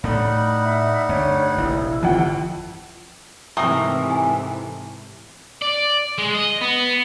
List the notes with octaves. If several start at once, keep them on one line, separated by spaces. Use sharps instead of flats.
A2 G3 A3 D#4 F#5 B5
E5
D2 G2 C#5
F1 A#1 E4
G1 F2 F#5 G5
G#2 C3 E3 A3 A#4 G5 A#5 D#6
G#5
D5
G#3
D#5
B3